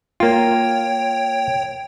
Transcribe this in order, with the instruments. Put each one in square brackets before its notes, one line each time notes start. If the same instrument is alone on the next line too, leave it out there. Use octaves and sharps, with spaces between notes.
[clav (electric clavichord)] A#3 F4 [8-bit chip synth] C#5 G5